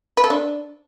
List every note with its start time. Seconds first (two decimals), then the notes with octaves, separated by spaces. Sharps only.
0.17 B4
0.24 A4
0.30 D4